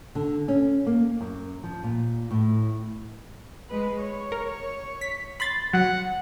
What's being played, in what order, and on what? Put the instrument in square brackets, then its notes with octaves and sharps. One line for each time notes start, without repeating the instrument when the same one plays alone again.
[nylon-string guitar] D3
C#4
A#3
F#2
F3
A#2
A2
[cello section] G#3 B4
C#5
[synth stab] A#4
B6
B5 C6 A6
[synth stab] F#3 [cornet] F#5